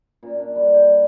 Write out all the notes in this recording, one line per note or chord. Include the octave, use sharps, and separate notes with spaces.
A#2 C#4
D4
G3 F#4
G4
G3